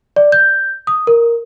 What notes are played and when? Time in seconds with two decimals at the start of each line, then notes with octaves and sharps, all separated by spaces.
0.16 D5
0.32 G6
0.87 D#6
1.07 A#4